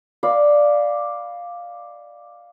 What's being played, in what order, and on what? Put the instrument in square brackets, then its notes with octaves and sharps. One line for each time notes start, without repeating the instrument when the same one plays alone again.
[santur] D5 D#5 F5 B5